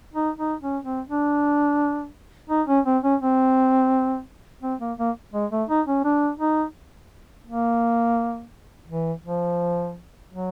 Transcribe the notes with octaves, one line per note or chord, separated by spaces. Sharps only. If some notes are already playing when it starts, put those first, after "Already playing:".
D#4
D#4
C#4
C4
D4
D#4
C#4
C4
C#4
C4
C4
A#3
A#3
G#3
A3
D#4
C#4
D4
D#4
A#3
E3
F3
F#3